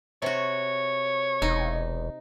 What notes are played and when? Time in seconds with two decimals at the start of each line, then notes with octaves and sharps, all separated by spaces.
0.22 C3 F#4 C#5
1.42 E1 D#4